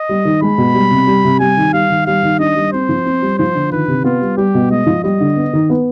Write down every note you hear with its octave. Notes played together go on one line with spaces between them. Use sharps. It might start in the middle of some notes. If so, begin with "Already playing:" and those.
Already playing: D#5
G3
D#3
G#3 B5
B2
G3
C3
G3
C3
G3 G#5
D#3
G3 F5
D#3
G3 F5
D#3
D4 D#5
G3
C4 C5
F3
C4
G3
F3 C5
D3
D#3 B4
C3
B3 F4
G3
G3 G4
B2
G#3 D#5
F3
G3 D#5
D3
B3
D#3
B3